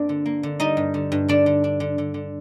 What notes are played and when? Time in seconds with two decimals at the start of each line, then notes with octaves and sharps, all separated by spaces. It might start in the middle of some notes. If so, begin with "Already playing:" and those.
Already playing: G2 A#3 C4 D4 D5
0.09 D3
0.26 A#3
0.43 D3
0.60 G3 D#4 D#5
0.77 G2
0.94 D3
1.12 G2
1.28 D3 D4 D5
1.46 D3
1.64 D4
1.80 D3
1.98 D3
2.14 D3